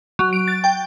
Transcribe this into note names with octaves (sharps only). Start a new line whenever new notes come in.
F#3
D7
A6
G5